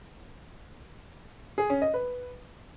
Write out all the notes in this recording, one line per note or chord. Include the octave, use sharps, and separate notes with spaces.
G#4
C#4
D#5
B4